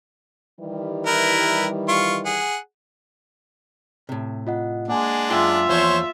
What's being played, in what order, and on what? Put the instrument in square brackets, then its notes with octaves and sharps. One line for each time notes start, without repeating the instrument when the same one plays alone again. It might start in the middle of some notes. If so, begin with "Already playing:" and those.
[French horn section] D#3 E3 G3
[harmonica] E4 A#4 B4
F4 C#6
G#4 F#5
[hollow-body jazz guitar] A2 C3
[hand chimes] F4 D#5 F#5
[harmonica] G#3 D4 [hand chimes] A#3 F#5 G#5
[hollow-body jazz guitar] F#2 G5 C6 [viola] F4 E5
[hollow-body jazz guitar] E2 F3 [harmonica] C5 C#5